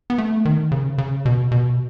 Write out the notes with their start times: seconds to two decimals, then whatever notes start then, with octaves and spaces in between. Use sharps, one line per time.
0.10 B3
0.18 A3
0.45 D#3
0.72 C#3
0.98 C#3
1.25 B2
1.52 B2